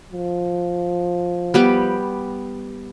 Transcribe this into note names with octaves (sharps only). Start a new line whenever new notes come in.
F3
G3 B3 G4